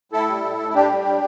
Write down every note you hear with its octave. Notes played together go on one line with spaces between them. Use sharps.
A2 E4 A4
G3
A2
A2
E4
A2 D4 G4
G3
A2